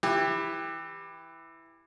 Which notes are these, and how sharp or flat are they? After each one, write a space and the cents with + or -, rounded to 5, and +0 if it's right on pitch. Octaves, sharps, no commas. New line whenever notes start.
E3 +0 G4 +15